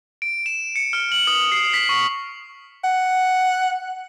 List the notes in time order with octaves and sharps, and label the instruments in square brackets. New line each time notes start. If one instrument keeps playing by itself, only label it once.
[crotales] D7
E7
C#7
F6
F#7
D#6
C7
B6
C#6
[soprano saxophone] F#5